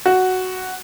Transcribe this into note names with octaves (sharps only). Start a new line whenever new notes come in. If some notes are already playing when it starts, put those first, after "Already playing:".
F#4